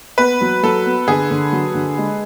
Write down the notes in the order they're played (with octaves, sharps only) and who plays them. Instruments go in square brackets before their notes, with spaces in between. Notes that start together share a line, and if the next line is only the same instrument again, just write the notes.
[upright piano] B3 [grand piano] B4
[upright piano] F#3
[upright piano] F#3 [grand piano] A4
[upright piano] B3
[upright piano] D3 [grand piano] G#4
[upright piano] D3
F#3
D3
G#3